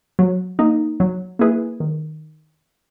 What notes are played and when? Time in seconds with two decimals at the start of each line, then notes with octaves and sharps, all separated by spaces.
0.19 F#3
0.59 A#3 D#4
1.00 F#3
1.39 A#3 E4 G#4 B4
1.80 D#3